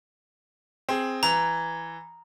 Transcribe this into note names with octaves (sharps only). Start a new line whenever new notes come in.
C4 G#4
E3 A#5